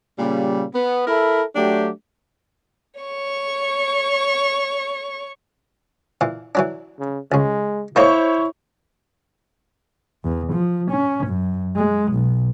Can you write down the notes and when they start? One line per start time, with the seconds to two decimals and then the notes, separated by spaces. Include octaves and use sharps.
0.19 A#2 C#3 G3
0.74 B3
1.07 E4 A4 A#4 E5 B5
1.55 F#3 A3 D4 G4
3.01 C#5 C#6
6.21 A#2 E3
6.55 E3 F#3 D4
6.99 C#3
7.32 C#2 C#3 G#3
7.96 A3 A#3 D#4 E4 C5 C#5 C#6
10.24 E2
10.53 F3
10.91 C#4
11.27 F#2
11.76 G#3
12.12 B1